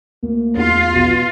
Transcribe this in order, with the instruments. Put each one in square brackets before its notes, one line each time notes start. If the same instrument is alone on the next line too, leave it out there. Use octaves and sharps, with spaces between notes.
[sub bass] D2 [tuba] A#3
[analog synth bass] E2 [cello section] F4
[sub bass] A#1 [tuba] B2